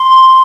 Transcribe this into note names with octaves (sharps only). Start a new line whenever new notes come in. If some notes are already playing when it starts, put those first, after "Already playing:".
Already playing: C6